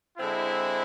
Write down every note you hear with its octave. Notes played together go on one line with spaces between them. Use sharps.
D3 G#3 C4 E4